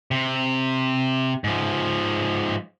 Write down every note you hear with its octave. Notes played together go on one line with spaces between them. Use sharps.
C3
G#2 F3